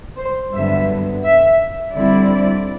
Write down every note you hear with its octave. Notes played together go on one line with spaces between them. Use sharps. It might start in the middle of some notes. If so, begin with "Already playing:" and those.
C5
G2 D3 F#3 B3 E5
E5
D3 G3 C4 E4 D5